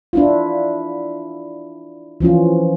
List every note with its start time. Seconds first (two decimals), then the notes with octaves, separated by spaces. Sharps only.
0.13 D4 E4 F4
2.20 E3 F3 C#4 F4